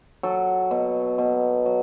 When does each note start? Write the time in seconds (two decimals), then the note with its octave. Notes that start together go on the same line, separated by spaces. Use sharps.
0.23 F#3 A4
0.71 B2
1.18 B2
1.66 F#3